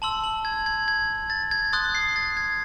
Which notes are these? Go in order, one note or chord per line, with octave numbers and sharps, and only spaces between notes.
A5 C6 E6 F#7
F#7
G#6
G#6
G#6
A6
G#6
C6 D#6 F#6 A6
C7
A6
G#6